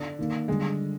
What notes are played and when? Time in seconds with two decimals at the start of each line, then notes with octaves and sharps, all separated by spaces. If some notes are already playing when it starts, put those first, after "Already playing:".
Already playing: D3 D4
0.19 D#3 A#3 D#4
0.48 D3 G3 G#3